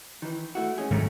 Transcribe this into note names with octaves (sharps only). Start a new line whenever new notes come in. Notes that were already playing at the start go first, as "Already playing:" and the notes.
D#3 E3
A3 E4 F#4
G#3 C#4 G#4
G#2 D#3 F#3 A3